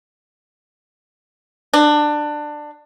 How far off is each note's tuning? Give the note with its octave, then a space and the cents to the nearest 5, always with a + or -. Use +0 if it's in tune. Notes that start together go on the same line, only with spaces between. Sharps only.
D4 +20